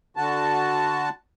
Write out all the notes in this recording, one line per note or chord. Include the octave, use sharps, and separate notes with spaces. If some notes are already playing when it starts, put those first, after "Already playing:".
D3 F#4 A5